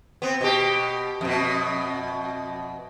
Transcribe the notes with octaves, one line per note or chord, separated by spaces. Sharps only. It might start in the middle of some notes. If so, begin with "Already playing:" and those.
B3 C4
B2 G4
F2 B2